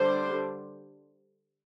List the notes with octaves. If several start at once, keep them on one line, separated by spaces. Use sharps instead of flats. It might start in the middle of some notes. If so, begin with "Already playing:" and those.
Already playing: D3 G3 D4 C5